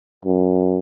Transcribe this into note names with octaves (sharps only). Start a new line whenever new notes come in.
F#2